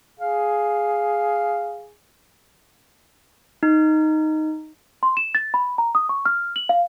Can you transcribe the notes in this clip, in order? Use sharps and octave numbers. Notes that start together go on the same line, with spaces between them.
G#4 F5
D#4
C6
E7
A6
B5
A#5
D#6
C#6
F6
F#7
F5